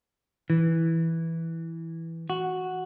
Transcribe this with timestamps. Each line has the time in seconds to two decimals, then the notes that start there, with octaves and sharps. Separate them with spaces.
0.50 E3
2.30 F#4